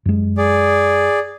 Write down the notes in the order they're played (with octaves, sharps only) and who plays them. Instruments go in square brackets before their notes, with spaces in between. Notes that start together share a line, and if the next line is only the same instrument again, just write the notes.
[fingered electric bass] F#2 G#3
[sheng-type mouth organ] G#4 D5